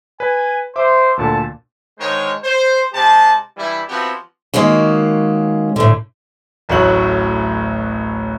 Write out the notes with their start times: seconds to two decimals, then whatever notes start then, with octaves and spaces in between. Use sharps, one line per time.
0.20 B4 G#5
0.76 C5 E5 D6
1.17 D2 A#2 D3 A5
1.99 D3 D#3 G#3 A#4 C5 C#5
2.43 C5
2.93 C3 G#3 G4 A5
3.57 G2 E3 G3 E4
3.89 F3 B3 C4 E4 F#4 G4
4.54 D#3 G#3 A#3 C#4 F#4
5.76 A2 D3
6.69 D1 A1 A2 F#3 F#4 F#7